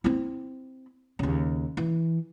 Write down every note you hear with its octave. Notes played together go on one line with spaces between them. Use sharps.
C4 E4
D#2 C#3
E3